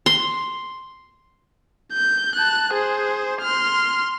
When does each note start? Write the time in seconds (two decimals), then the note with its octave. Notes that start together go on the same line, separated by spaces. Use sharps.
0.06 C6
1.93 G6
2.35 A5 F#6
2.73 G#4 C5
3.41 C6 F6